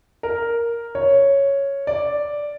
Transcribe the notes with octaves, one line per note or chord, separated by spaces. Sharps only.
A#4
C#5
D5